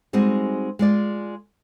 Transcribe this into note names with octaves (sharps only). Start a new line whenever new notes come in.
G3 G#3 C4 D#4 F#4 G#4
G#3 F4 D5